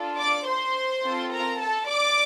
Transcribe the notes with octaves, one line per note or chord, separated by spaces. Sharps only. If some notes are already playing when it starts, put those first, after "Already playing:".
Already playing: D4 F4 A4
D5 D6
C5 C6
C4 F4 A4
A#4 A#5
A4 A5
D5 D6